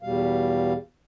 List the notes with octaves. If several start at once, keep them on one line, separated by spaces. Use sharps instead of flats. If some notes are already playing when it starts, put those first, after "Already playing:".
E2 B2 G3 F5